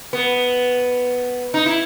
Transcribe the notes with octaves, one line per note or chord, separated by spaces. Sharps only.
B3
D#4
E4